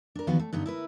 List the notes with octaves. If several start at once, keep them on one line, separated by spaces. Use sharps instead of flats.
D4 A#4
E2 D#3 F3 B3 F#4 F5
A3
G2 D3 B3 D#4
E4 A#4 B4